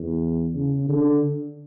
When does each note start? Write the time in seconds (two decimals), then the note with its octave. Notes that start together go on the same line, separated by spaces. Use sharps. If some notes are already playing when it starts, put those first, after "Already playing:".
Already playing: E2
0.55 C#3
0.89 D3